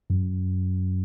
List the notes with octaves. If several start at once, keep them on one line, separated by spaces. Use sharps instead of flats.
F#2